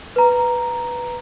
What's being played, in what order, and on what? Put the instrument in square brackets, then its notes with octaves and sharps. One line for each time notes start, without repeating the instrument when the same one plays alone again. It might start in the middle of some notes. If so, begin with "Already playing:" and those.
[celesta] B4 A#5